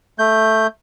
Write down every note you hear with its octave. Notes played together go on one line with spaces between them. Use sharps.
A3 G6